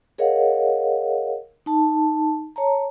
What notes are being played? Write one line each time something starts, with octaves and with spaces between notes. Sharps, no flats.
G#4 A#4 C#5 D#5 F5 F#5
D#4 A5
C#5 A5 A#5